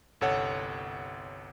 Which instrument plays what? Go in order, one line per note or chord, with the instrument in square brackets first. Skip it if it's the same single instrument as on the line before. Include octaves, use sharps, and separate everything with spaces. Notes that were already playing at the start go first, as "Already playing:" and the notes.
[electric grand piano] G1 C2 A4 C#5 F#5